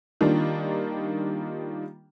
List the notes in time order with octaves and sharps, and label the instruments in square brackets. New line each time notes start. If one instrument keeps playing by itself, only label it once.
[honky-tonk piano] D#3 G3 A#3 D4 F4